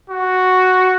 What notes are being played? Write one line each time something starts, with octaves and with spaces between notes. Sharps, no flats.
F#4